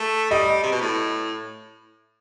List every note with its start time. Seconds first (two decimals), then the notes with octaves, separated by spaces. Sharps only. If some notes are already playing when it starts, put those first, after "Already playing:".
Already playing: A3
0.31 G3 D#5
0.63 C3
0.72 B2
0.81 A2